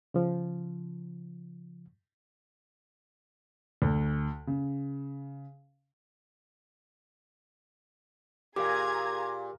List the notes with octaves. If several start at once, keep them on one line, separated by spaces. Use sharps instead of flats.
C#3 F3
D2
C#3
A#2 G4 G#4 A#4 F5 A#5 D6 G#6